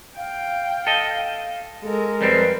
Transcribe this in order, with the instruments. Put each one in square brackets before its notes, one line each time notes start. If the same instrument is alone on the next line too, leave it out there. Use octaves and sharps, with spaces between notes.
[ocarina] F5 [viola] G5
[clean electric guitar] A4 D#5
[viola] G#3 A#4 [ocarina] A4
[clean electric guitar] F2 G3 C4 [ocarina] B4